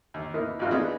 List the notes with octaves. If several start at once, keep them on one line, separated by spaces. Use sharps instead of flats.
D#2
A#3 B3 D#4 E4 A#4
A1 F2 D#4 F4 F#4 F5
B3 D4 D#4 G#4